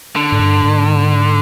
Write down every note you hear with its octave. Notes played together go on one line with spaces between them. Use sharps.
D3
G#2
G2
G#2